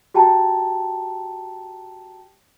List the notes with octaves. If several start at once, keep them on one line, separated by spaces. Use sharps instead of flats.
F#4 G4 G5 A5 A#5